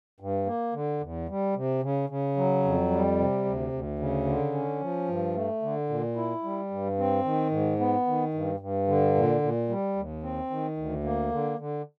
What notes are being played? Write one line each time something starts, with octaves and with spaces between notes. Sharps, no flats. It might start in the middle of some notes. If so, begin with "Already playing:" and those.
G2
A#3
D3
E2
G3
C3
C#3
C#3
F#3
F2
G3
C3
D2
D2
C#3
D3
C#4
F3
G2
A3
D3
A#2
E4
G3
G2
C4
D#3
G#2
B3
D#3
G2
G2
D3
A#2
A#2
G3
D#2
C4
D#3
D2
A#3
D3
D3